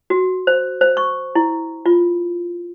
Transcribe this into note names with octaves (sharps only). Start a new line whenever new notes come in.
F#4
C5
C5
C#6
E4
F4